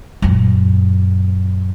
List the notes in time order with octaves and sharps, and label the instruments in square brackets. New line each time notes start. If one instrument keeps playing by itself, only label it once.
[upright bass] F#2 A#2